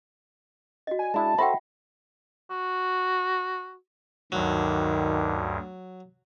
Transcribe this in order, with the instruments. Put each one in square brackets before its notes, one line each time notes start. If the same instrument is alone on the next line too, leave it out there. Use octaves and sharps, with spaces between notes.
[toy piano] F#4 D#5
[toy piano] D5 [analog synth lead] G#5
[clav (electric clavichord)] G#3 D4 E4 [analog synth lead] A5
[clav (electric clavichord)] F#4 A4 C5 [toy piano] E5 F#5 G5 [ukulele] B5
[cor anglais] F#4
[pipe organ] D2 G2 [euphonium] D#3 [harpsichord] F#3